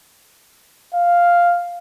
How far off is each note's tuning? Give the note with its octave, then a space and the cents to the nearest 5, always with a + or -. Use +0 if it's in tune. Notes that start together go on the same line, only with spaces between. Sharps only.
F5 +0